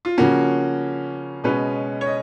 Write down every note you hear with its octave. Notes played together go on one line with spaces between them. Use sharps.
F4
C#3 F3 A#3 C#4 F#4
B2 G#3 C#4 B4
C#5
D#5